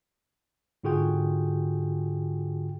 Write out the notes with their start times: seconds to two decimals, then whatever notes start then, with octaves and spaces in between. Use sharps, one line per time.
0.84 G#2 D3 F4 F#4 G#4 G5